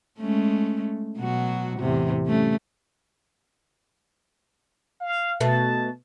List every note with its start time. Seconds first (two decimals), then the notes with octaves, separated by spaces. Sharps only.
0.19 G#3 A3 C#4
1.19 B2 F#3 F#4
1.79 E2 A2 C3
2.26 G3 A3 C#4
5.00 F5
5.40 B2 A3 A5